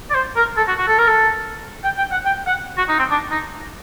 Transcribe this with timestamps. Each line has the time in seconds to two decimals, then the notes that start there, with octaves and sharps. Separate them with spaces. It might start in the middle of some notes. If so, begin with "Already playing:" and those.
0.10 D5
0.15 C5
0.36 A#4
0.57 A4
0.68 F#4
0.78 F#4
0.88 A4
0.99 A#4
1.08 A4
1.84 G5
1.98 G5
2.12 F#5
2.25 G5
2.46 F#5
2.78 F#4
2.89 D#4
2.99 C4
3.11 D4
3.31 D#4